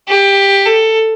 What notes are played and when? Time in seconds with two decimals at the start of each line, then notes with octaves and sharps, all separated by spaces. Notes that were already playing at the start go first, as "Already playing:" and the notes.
0.08 G4
0.66 A4